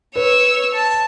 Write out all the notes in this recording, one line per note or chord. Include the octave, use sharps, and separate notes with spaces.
B4 C#5 E6
A5